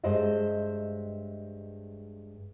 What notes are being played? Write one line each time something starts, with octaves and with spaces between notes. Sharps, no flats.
G2 G#3 C5 D#5 E5